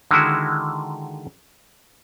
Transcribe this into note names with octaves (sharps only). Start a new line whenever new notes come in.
D3 D#3 G#3 E4 F#4